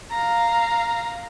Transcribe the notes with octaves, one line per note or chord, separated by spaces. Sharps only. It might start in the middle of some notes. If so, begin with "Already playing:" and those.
F5 A#5